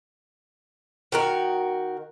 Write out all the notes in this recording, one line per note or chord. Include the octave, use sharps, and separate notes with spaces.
D#3 F#4 A#4